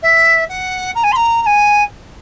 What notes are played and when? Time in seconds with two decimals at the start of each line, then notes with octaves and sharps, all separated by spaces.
0.02 E5
0.49 F#5
0.95 A#5
1.03 G#5
1.11 C6
1.15 A#5
1.41 A#5
1.46 G#5